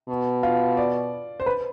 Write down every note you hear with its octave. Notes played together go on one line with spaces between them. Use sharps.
B2
F4
D5
C5
B4